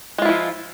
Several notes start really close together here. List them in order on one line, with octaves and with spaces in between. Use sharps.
G#3 F4 E4 F3